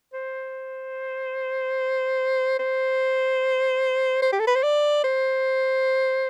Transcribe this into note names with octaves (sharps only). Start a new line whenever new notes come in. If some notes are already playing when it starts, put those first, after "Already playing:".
C5
C5
C5
G4
A4
B4
C5
D5
C5